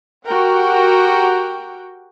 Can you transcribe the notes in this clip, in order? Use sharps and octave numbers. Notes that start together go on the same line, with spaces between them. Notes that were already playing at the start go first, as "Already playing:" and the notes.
F#4 G4 A#4 F#5 G5